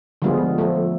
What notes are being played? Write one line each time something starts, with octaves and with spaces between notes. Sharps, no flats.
D3 F3 G3 G#3 B3 F4
F3 A3